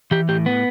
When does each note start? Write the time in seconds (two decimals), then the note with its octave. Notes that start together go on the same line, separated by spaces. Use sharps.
0.11 E3 G4
0.29 A2 G4
0.46 B3